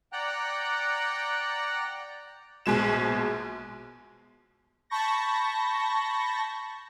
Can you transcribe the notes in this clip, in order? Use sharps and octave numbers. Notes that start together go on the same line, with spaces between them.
D5 F#5 G5 A#5 F#6
A#1 B2 G#3 E7
A5 B5 C#6 G6 A#6